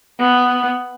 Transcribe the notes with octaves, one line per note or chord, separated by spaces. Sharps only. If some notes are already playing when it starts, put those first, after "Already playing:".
B3